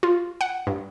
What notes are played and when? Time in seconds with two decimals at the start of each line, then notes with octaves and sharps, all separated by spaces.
0.03 F4
0.41 F#5
0.67 G2